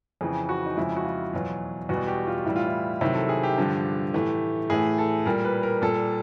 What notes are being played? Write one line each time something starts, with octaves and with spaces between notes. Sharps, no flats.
F2 C#3 E3 G#4
F#4
D#4
F2 C#3 F3 G#3 E4
F#4
F4
E2 B2 F#3
E2 B2 G3 F#4
G4
F4
A2 E3 G3 E4
F4
E4
C3 D#3 F#3 E4
A4
G#4
G4
G2 D3 F3
A2 E3 A3
A2 E3 A3 G#4
A4
A#2 G3 A#4
B4
A#4
A#2 G3 A4